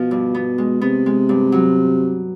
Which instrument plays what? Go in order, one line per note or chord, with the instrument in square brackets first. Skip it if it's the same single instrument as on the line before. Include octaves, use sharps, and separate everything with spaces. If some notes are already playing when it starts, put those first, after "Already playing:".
Already playing: [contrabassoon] B2 [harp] F3
[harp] G2
B3
G#3
[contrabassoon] C3 [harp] B3
[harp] G#3
G2
F#3